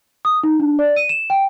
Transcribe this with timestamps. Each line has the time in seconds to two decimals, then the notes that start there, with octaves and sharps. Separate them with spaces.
0.25 D#6
0.43 D#4
0.60 D4
0.79 D5
0.96 D#7
1.09 E7
1.30 G5